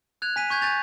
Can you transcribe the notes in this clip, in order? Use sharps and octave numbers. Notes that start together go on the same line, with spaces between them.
F#6 G#6 F7
G#5 B6 D#7
C#6 G6 G#6
G#5 G6 A6 F7